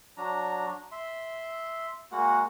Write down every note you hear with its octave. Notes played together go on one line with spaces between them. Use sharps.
F#3 D4 A#5
E5 C6
G#3 A#3 F#4 F#5